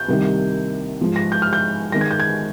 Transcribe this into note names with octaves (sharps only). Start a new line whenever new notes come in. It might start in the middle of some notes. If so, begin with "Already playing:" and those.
Already playing: G6
C2 C3 D#3 G3 A#3
G#2 F3 G#3
A#6
G6
F6
G6
G#2 D#3 G#3 A#6
G#6
G6
G#6